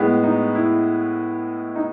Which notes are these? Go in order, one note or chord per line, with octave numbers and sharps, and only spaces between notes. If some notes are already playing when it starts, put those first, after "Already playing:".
Already playing: A2 G#3 B3
D#4
E4
D#4